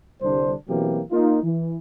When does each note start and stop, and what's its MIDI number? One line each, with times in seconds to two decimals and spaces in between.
0.22 0.53 36
0.22 0.53 50
0.22 0.53 55
0.22 0.53 62
0.22 0.53 72
0.68 1.01 47
0.68 1.01 52
0.68 1.01 54
0.68 1.01 58
0.68 1.01 60
0.68 1.01 67
1.11 1.41 58
1.11 1.41 63
1.11 1.41 65
1.43 1.77 52